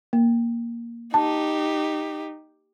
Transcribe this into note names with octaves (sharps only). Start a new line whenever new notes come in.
A#3
D#4 G4 A5